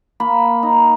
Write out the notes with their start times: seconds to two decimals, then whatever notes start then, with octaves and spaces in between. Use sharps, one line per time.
0.20 A#3 B5
0.63 D#4